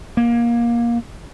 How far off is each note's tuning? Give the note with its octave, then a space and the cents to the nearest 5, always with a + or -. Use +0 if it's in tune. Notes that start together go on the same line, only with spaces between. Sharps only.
A#3 +20